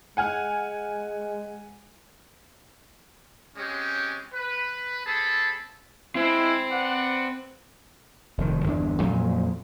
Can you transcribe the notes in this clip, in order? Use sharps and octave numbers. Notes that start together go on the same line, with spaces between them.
G#3 F#5 G#5 F6
G#3 C4 C#4 G4 C#5
B4
C4 G#4 A4 A5 B5
G#3 C4 E4 C5
B4 D5 F#5
F1 F2 D#3
G1 E2 D4
F2 A#2 F#3